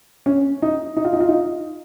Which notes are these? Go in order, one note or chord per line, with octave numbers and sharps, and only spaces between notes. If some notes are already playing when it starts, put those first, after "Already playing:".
C#4
D#4
D#4
F4
D#4
F4
D#4